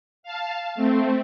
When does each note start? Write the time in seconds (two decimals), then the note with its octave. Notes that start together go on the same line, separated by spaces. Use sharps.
0.23 F5 A5
0.75 A3 C4